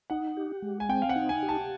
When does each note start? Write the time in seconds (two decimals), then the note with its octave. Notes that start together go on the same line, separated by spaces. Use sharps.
0.10 D#4 F#5
0.37 G4
0.62 G#3
0.80 G#5
0.89 C4 G5
1.02 F5
1.09 F#5
1.16 D#4
1.29 G#5
1.43 G4
1.49 A5